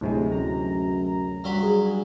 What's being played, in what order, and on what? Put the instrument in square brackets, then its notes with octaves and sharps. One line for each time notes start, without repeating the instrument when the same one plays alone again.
[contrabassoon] D1 [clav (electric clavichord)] D2 C3 G#3 [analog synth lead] A2
[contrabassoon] F#2 [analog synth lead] A#5
[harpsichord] G2 F#3 B5
[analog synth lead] G#4